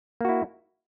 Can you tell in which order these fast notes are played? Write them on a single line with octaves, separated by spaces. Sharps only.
A#3 F#4 E4